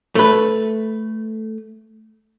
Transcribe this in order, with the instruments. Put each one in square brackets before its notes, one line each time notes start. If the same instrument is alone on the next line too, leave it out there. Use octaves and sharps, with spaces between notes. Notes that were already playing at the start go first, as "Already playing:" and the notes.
[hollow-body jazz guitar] A3 B4